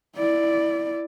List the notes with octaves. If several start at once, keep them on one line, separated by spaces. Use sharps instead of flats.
E4 D5